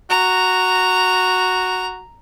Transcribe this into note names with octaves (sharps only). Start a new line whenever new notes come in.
F#4 A#5